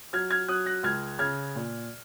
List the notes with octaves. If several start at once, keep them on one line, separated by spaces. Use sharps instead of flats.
F#3 F6 G#6
F6 G#6
F#3 D#6 F#6
F#6 A#6
C#2 F6 G#6
C#3 F6 G#6
A#2